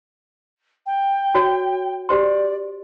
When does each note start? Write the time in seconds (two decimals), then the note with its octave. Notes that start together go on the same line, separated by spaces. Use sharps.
0.86 G5
1.35 F#4 C#5
2.09 G4 C5 D5 C6